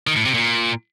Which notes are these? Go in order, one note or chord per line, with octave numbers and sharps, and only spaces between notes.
D#3
A2
C3
A#2